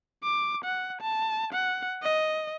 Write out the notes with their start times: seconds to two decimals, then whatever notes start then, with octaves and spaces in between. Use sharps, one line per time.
0.23 D6
0.64 F#5
1.01 A5
1.53 F#5
2.03 D#5